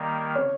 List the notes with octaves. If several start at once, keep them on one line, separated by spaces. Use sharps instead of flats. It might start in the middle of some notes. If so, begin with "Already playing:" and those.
Already playing: D#3 G3 A#3
C#5